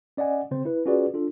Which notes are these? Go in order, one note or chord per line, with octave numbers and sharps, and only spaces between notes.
C#4 D5 D#5 F#5 G#5
C#3 C4 C5
E4 B4
C#4 F4 F#4 G#4 B4 D5
D4 F4 A4